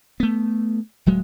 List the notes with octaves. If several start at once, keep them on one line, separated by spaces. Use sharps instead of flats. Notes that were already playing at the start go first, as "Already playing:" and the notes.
A3 B3
D1 F#3 G#3